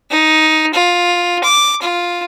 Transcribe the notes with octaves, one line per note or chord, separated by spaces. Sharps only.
D#4
F4
D6
F4